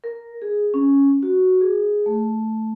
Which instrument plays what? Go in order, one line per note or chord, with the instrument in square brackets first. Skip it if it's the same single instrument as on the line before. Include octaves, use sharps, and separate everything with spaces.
[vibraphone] A#4
G#4
C#4
F#4
G#4
A3